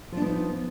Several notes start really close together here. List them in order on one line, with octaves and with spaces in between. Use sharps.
F3 D4 B3 D#4